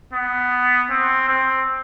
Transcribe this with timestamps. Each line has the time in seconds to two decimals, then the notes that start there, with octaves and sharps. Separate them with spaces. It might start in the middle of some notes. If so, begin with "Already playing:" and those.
0.13 B3
0.90 C4
1.28 C4